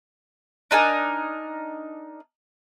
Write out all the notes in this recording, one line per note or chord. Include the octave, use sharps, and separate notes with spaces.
D4 D#4 A#4 G#5